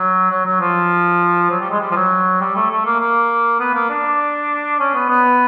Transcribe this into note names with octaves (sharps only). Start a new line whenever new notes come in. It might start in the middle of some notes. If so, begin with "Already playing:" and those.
Already playing: F#3
F#3
F#3
F3
F#3
G3
G#3
G3
F3
F#3
G3
A3
A3
A#3
A#3
B3
A#3
D4
C#4
B3
B3